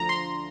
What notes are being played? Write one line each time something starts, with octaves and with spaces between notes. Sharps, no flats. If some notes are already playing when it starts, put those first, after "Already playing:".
Already playing: D2 D3 F3 A#5
C6